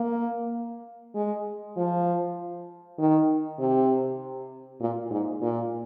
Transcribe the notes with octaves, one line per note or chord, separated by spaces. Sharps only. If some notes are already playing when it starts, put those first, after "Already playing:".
Already playing: A#3
G#3
F3
D#3
C3
A#2
G#2
A#2